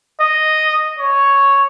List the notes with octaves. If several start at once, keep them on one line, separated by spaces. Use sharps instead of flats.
D#5
C#5